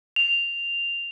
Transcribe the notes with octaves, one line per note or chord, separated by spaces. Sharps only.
F7